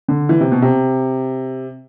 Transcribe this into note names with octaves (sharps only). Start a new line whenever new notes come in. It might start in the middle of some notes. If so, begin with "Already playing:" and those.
D3
E3
C3
B2
C3